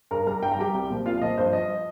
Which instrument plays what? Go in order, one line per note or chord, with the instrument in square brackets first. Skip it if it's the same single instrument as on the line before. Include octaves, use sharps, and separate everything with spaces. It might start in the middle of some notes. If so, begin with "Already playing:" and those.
[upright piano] G2 A#4 A#5
G3 A#4 A#5
G2 G5
A#5
G3 G4 G5
C2
A#2 F3
C2 F4 F5
A#2 F3 D#5
G2 C5
F3 D#5